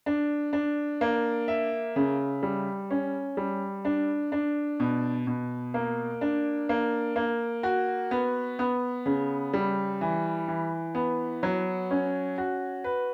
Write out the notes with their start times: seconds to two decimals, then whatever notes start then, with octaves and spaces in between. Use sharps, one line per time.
0.06 D4
0.53 D4
1.01 A#3
1.48 E5
1.96 C#3
2.43 G3
2.91 C#4
3.37 G3
3.85 D4
4.32 D4
4.80 B2
5.27 B2
5.74 A#3
6.21 D4
6.69 A#3
7.16 A#3
7.63 F#4
8.11 B3
8.59 B3
9.06 C#3
9.53 G3
10.01 E3
10.48 E3
10.95 B3
11.43 F#3
11.91 C#4
12.38 F#4
12.84 B4